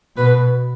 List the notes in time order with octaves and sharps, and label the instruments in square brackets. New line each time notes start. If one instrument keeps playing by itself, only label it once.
[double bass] B2 [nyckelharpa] B4